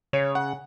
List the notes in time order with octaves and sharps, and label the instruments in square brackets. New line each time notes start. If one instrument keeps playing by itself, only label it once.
[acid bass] C#3 [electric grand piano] C#5
[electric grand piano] F#5